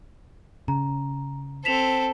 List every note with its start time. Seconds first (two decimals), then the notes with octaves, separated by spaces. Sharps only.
0.68 C#3 A#5
1.65 C4 A4 B6 E7 F7